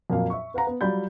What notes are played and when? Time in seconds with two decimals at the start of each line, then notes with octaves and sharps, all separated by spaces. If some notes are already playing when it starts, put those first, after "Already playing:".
0.10 F2 A#2 F#3 A#3 F5
0.30 E5 C#6
0.54 B4 F5 F#5 A#5
0.67 B3
0.81 F#3 G3 F4 D5 B5 G6